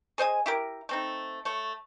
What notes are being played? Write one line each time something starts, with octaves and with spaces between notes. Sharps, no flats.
G#4 C5 D#5 G#5
E4 G4 A#4
A3 C4 D#4
A3 C#5